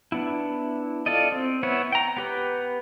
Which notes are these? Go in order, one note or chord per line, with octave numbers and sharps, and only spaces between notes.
B3 D4 E4
F4 A4 D5 D#5
C4
B3 E4 C#5
G5 A#5
B3 G4 B4